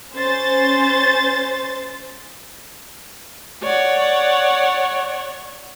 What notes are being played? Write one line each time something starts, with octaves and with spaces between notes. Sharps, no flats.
C#4 C5 A6
C#5 D5 F#5